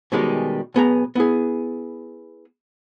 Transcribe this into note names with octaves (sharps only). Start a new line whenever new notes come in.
B2 D#3 G3 G#3 C#4 G4
B1 B3 G#4 A#5
B3 E4 G#4